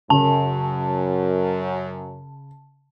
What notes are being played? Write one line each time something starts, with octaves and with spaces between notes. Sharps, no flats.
F#2 C#3 A5